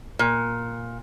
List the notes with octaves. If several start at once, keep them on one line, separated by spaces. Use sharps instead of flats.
A#2